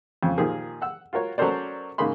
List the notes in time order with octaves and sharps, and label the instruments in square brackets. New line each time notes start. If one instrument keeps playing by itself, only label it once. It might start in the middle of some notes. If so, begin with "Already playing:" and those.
[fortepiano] F2 C#3
A#2 D#3 F3 G4 G#4 A#4
F#5 E6
F4 F#4 A#4 C#5
F#3 C#4 A4 A#4 C5 D5
G#2 C#3 A#3 G#4 B5 C6